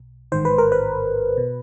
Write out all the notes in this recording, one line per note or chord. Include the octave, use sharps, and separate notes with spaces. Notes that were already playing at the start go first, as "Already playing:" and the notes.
Already playing: B1
A1 G#2 D#3 C5
B4
A#4
B4
B2